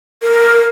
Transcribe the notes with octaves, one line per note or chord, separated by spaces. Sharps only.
A#4